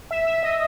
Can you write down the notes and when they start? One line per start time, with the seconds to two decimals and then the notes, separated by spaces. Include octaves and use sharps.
0.11 E5
0.27 E5
0.43 D#5